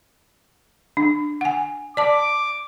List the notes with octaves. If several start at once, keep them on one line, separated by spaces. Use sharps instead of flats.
D4
F#5 G#5
D5 A5 D6